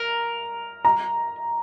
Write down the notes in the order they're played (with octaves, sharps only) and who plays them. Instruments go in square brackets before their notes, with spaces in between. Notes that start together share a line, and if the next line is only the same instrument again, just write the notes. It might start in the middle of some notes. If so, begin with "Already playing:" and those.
Already playing: [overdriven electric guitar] A#4 [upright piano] A#5
[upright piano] A#5